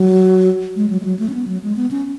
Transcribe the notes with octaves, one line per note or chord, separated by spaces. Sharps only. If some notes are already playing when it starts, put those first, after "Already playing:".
Already playing: F#3
G#3
F#3
G#3
F#3
A3
C#4
B3
F#3
G#3
B3
C#4